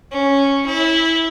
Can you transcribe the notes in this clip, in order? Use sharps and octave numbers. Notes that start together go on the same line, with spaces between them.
C#4
E4